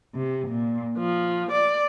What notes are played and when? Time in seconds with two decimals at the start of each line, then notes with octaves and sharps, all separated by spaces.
0.15 C3
0.48 A#2
0.98 F3
1.51 D5